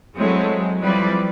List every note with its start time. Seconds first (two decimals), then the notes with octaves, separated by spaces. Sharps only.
0.17 F#3 G#3 C4 E4 A4 C#5
0.82 F3 G3 C4 E4 G#4 B4 D5